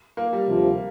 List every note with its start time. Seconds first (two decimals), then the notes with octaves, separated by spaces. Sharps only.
0.17 A#3
0.33 G3
0.48 D2 C3 F3